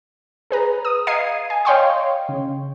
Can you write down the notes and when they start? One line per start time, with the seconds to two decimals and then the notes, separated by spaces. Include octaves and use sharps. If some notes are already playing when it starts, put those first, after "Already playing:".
0.51 G#4 B4 A#5
0.85 D#6
1.07 D#5 F5 A#5 G#6 C7 D#7
1.50 G#5
1.65 C#5 D#5 F5 G5 C6 C#6
2.29 C#3